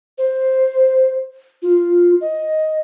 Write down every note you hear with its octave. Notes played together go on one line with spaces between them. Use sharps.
C5
F4
D#5